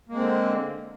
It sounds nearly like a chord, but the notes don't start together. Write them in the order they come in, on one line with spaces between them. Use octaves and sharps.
A#3 G#3 C4 D3